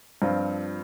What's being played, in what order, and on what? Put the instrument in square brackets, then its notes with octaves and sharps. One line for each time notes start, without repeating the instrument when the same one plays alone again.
[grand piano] G2 F3 C4 F4